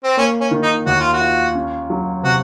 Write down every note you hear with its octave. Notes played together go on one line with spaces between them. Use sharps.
C4
A#3 C#4
C#4
D#3
D#4
D#2 F#4
F4
F#4
F4
C#4
F#3
C3 F#4